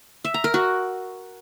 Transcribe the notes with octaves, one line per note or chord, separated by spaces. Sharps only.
E5
A#5
A#4
F#4